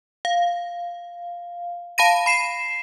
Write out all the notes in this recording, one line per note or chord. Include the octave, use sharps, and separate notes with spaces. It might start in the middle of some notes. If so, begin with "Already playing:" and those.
F5
F5 A5 B5 A#6 D#7
B5 C7 E7